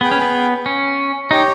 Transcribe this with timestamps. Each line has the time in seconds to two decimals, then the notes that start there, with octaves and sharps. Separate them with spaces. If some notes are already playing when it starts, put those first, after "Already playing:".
0.01 B3 G#4 B4 G5
0.11 C#4
0.22 B3
0.66 C#4
1.31 D#4 G4 C#5 G5